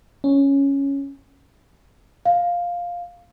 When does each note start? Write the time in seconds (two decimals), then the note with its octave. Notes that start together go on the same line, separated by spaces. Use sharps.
0.24 C#4
2.25 F5